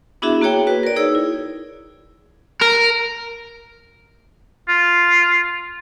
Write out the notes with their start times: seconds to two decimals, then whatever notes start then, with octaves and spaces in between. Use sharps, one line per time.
0.22 B3 D4 E4 F#4 G#4 E5
0.41 A#3 F#4 G#4 C#5 G5
0.67 F#4 B4
0.83 A#4 D5
0.96 D#4 G#4 C#5 E6
1.15 E4
2.61 A#4
4.69 F4